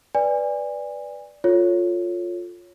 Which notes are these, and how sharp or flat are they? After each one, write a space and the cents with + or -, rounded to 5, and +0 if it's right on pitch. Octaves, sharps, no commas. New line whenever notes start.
B4 +0 D5 +0 G#5 -30
F4 +10 A4 +10 C#5 +0